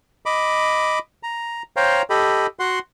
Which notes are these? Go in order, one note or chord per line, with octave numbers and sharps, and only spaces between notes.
D#5 B5 D6
A#5
C5 C#5 F5 G5 A#5
G4 A4 D#5 B5
F#4 F#5 C6